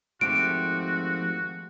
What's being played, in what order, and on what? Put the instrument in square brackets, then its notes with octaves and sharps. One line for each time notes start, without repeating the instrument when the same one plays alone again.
[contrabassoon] G#1 [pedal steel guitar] F3 A3 G4 [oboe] F#4 [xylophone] D7